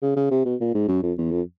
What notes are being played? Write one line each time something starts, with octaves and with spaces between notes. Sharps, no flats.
C#3
C#3
C3
B2
A#2
G#2
F#2
F2
E2
F2